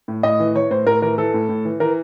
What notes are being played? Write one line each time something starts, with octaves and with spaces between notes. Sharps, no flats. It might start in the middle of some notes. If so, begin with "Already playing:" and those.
A2
A2 D#5
E3
E3 C#5
A2 C5
A2 A#4
E3 A#4
E3 A4
A2
A2
E3
E3 A#4